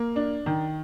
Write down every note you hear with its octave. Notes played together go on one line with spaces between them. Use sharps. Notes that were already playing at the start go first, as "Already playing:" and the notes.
Already playing: A#3
D4
D#3